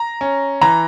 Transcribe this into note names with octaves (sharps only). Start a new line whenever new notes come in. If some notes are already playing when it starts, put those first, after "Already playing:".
Already playing: A#5
C#4
E3 A#5